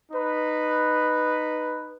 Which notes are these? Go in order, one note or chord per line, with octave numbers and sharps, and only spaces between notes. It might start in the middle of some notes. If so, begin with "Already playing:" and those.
D#4 B4